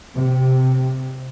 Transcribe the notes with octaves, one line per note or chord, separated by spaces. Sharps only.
C3